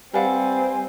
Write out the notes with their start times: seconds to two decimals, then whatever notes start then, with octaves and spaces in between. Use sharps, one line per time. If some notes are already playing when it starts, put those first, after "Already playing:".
0.14 G3 C4 B4 F5 F#5 G#5